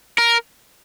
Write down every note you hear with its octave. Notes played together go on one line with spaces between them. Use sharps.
A#4